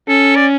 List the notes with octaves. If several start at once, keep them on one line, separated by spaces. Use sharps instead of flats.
C#4 A4
D5